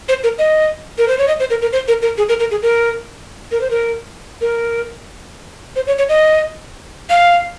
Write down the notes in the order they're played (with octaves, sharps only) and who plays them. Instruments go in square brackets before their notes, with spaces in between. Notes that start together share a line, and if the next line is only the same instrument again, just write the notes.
[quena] C5
A#4
D#5
A#4
C5
C#5
D#5
C5
A#4
A#4
C5
A#4
A#4
G#4
A#4
A#4
G#4
A#4
A#4
C5
A#4
A#4
C5
C#5
C#5
D#5
F5